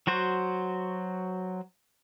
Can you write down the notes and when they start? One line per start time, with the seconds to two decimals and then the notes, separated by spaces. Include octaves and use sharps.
0.07 F#3 F#4 C5